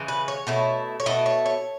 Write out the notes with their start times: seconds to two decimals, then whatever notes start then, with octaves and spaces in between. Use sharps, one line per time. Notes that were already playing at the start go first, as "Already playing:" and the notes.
Already playing: C#3 E3 G#3
0.08 B4
0.28 C#5
0.47 B2 A3 E4
1.00 C#5
1.06 B2 A3 E4 D#5
1.26 C#5
1.46 C#5